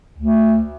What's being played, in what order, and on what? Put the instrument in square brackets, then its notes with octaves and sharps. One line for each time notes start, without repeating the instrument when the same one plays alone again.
[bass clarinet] D2